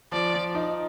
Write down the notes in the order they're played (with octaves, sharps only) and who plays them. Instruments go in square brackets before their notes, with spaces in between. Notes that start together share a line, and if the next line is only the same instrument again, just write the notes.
[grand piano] F3 [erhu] D5
[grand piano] F3
D#4